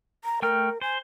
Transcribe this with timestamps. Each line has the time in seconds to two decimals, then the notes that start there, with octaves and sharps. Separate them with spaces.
0.24 A#5
0.42 A3 A#4 G5 F6
0.81 C5 G#5